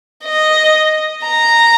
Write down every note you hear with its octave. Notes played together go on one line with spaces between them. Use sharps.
D#5
A#5